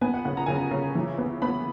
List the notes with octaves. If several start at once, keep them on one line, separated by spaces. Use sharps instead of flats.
B3 G#5
F#5
C#3 F#5
A#5
C#3 G#5
A#5
C#3
E3
B3
B3 B5